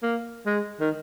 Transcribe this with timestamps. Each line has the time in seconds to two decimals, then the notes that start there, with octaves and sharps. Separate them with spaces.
0.02 A#3
0.46 G#3
0.80 D#3